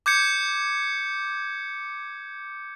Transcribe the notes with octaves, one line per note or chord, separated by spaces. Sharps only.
D6 G6 G#6 C#7